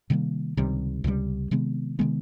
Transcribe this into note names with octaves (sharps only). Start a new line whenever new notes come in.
C3 D#3 G3 A#3
C#2 C3 D#3 G3
C#2 C3 D#3 G3
C3 D#3 G#3 B3
C3 D#3 G#3 B3